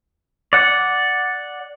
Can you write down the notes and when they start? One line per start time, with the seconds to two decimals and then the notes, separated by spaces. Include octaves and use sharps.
0.53 D5 F#5